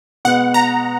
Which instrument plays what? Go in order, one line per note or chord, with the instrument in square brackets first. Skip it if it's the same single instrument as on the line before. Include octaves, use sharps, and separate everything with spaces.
[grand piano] B2 G#3 B3 [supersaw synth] F#5
[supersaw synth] A#5